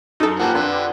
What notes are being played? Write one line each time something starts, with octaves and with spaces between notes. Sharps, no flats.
F#2 D#4 A4
F3 A#3 G4 B4 F#5 A5 F#6
F2 D3 D4 C6